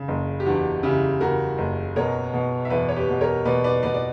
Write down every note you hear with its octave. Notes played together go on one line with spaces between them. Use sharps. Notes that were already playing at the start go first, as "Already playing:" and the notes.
Already playing: C#3
F#1
G4
E2 D4 F#4
C#3 E4 G4
C#3 F#4 A#4
F#1
B2 A#4 C#5
B2
E5
E2 B4 D5
C#5
G4 B4
B2
A#4 C#5
B2 B4 D5
B4 D5
B2 B4 D5
D5